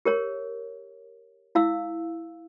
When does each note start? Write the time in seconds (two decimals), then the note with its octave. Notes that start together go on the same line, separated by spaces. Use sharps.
0.05 G4 A#4 C#5
1.55 E4 F5 E6